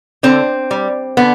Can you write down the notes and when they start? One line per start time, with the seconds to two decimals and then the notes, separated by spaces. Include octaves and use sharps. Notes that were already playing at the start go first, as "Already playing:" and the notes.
0.23 D3 C4
0.71 G3
1.17 D3 B3